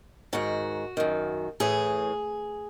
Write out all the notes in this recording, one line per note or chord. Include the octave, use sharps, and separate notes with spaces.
G#2 D#3 F#4
F#2 D#3
A2 E3 G#4